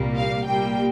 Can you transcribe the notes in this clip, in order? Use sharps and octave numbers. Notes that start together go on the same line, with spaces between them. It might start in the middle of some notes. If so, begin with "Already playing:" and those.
Already playing: C2 A#2 G3 A#3
F5
A#2 G3 A#3 G5